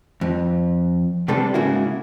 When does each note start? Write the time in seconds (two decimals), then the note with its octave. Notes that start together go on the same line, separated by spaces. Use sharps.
0.21 F2
1.28 C3 G3 C4 D4 A4 B4
1.54 G#2 C#3 A#3 E4 F#4